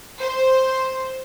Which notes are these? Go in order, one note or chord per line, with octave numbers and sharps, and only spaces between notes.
C5